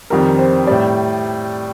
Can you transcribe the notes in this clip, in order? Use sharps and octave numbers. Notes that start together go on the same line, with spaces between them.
F2 D#3 G3 A#4
C5
A2 G3 D5